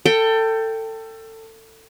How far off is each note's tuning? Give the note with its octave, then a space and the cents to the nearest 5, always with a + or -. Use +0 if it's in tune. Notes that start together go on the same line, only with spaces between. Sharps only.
A4 +25 G5 +0